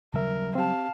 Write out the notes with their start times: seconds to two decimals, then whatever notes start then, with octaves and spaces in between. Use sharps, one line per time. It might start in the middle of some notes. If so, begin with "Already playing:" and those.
0.14 D#2 C#3 F#3 G3 A#4 E5
0.55 C4 G4 F5 A5